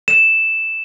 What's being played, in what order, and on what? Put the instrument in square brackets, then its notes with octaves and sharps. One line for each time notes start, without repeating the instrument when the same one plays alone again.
[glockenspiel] E7